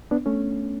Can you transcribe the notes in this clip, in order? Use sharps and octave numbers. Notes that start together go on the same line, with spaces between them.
B3 D4
A3 C#4